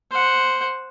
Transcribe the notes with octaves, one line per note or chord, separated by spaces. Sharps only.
C5 F#5